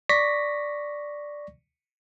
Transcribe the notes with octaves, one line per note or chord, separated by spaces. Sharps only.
D5 C#6 A#6 B6